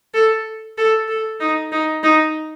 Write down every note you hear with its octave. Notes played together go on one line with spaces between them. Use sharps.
A4
A4
A4
D#4
D#4
D#4